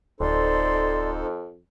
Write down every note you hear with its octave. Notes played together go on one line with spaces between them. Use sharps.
D1 F2 D#4 A4 C5 D5 C6